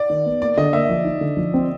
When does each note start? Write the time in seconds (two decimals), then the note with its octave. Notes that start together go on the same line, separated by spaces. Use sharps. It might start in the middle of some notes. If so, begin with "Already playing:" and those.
Already playing: D5
0.10 D#3
0.26 B3
0.41 A#3 D5
0.57 D3 D#5
0.73 A#3 E5
0.89 F3
1.05 D#4
1.21 D3
1.37 F3
1.54 C4